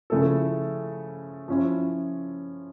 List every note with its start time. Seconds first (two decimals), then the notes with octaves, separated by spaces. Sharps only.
0.10 C#3 F3 A3 E4 A4
1.48 F3 C#4 E4